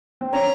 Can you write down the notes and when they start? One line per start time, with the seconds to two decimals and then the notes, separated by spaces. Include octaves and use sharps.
0.21 C4
0.33 C#4 A#5